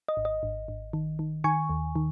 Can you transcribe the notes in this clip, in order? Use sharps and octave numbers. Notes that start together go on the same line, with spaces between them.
D#5
G#1
D#5
G#1
G#1
D#3
D#3
D#3 G#5 C#6
D#2
D#3